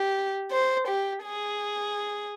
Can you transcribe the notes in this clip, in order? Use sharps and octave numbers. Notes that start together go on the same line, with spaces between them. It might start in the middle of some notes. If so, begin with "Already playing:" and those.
Already playing: G4
C5
G4
G#4